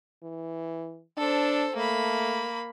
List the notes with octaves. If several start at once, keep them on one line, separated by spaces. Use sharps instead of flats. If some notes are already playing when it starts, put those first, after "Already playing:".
E3
D4 A4 C5
A3 A#3 B5